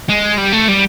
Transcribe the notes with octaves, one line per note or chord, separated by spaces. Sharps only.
G#3
G3
A3
G3